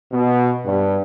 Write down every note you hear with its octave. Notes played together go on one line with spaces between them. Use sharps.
B2
G2